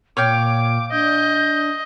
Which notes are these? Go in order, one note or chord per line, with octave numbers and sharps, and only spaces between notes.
A#2 C#5 F5 G5 D6
D4 D#5 G6